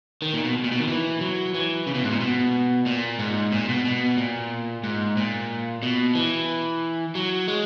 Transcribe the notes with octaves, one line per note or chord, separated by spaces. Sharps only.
D#3
A#2
B2
A#2
B2
D#3
E3
F#3
E3
C#3
B2
G#2
A#2
B2
A#2
G#2
A#2
B2
B2
A#2
G#2
A#2
B2
E3
F#3
G#3